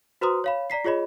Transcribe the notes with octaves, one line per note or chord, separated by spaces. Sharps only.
F#4 B4 C5 A#5 C6 D#6
C#5 F5 B5
D5 A#5 B6 C7
F4 G#4 C#5 D#5 B5